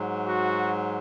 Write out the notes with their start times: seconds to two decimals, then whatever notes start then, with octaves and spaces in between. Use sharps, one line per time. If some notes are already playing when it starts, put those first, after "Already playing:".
Already playing: G#2 F#3
0.27 F#4